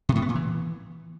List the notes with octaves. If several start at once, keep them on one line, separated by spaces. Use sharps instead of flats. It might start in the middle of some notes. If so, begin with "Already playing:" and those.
C3
A2
B3
A#2
E3